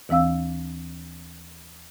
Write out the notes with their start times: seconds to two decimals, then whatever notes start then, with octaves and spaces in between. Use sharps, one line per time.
0.09 D#2 E3 C4 F5 E6